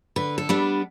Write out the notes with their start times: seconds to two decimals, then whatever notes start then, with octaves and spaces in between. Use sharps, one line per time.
0.16 D3 B4
0.38 A4
0.49 G3 B3 D4